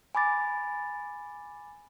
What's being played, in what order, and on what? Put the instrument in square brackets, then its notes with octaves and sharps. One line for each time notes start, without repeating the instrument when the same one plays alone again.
[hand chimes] G#5 B5 D6 A6